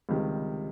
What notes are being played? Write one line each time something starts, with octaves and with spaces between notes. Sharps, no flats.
C#2 C3 D#3 G3